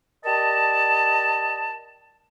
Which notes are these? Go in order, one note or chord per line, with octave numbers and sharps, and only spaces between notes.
G4 A#4 D5 D#5 A5